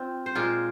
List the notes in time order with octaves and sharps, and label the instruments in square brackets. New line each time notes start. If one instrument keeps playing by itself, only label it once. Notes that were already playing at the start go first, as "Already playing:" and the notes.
Already playing: [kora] C4 F4
C5
A#2 G#3 F4 A#4